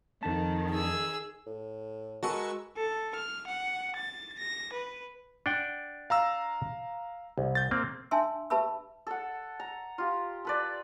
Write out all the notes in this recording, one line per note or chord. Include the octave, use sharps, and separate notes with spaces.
F2 D#3 A5
G#4 E6
A2
G#3 F#4 A#4 B4 A5 C#6 E6
A4
F6
F#5
A6
A#6
B4
D4 F#5 G5
F5 A#5 E6
C2
G6 A6
A#3 C4
D4 E5 G#5 A5 C6 E6
G4 B4 E5 A5 B5 E6
A4 F#5
A#5
F4 G4
A4 B4 D5